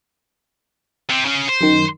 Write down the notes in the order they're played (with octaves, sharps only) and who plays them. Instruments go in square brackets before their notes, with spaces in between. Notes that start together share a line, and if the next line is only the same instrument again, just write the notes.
[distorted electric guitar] C3
C#3 C#4
C5
[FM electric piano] F#2 D#3